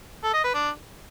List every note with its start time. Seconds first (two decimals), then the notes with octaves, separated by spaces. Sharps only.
0.24 A4
0.34 D#5
0.44 B4
0.54 D4